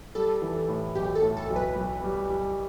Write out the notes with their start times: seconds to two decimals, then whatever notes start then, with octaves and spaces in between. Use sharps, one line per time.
0.15 G3 A4
0.42 E3
0.68 A2
0.95 B1 G4
1.15 A4
1.22 A2
1.37 A4
1.50 B1
1.56 B4
1.76 B1
2.03 G3
2.30 G3